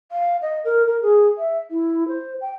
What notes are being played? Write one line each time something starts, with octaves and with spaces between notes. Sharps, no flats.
F5
D#5
A#4
A#4
G#4
E5
E4
C5
G5